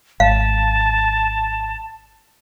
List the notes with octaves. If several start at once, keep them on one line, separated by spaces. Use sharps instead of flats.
G#1 F5 A5